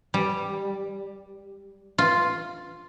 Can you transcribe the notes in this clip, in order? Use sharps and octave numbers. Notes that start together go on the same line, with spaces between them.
G3
F4